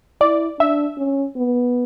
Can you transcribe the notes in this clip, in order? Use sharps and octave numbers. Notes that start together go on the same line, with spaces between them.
E4 D5
D4 E5
C#4
B3